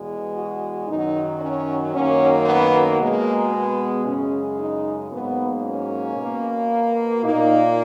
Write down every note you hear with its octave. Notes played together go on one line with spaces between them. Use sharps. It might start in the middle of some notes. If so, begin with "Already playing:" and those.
Already playing: E2 B2 G#3
F#4
F#2 D#3 F#3 D#4
C#4
F#2 D#3 F#3 A#3 C#4
B3
B2 G#3 A#3
B3
F#2 C#3 G#3 C#4
D#4
G#2 F#3 A#3 B3
C#4
B2 A#3
A#2 A#3 D#4